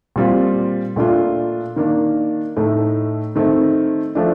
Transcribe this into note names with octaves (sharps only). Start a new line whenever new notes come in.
A#2 G3 C4 F4
A#2 A3 D4 F4
D#3 A#3 D4
A2 A3 D#4
D#3 A3 C4
F3 A3 D4